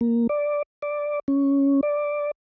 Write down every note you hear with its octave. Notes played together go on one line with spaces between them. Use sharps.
A#3
D5
D5
C#4
D5